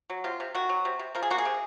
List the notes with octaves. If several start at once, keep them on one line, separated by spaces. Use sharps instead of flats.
F#3
C3 F4
C3
D#3 F#4
F#3
C3
C3
F3 A#4
G#4
A#3 F#4
G#4
C3